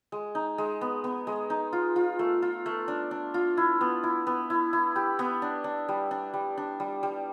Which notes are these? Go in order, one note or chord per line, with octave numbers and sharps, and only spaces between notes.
G#3
D#4
G#3
B3
B3
G#3
D#4
F4
F4
A3
F4
A3
D4
D4
F4
E4
B3
E4
B3
E4
E4
G4
B3
D4
D4
G3
D4
G3
D4
G3
G3